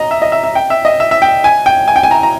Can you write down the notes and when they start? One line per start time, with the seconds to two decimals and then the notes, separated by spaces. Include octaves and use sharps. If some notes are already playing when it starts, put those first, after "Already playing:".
Already playing: D#5 A#5
0.11 E5
0.22 D#5
0.32 E5
0.44 E5
0.55 G5
0.70 E5
0.85 D#5
1.00 E5
1.11 E5
1.22 G5
1.44 G#5
1.66 G5
1.88 G#5
1.96 G5
2.03 G#5
2.11 A#5
2.23 A#5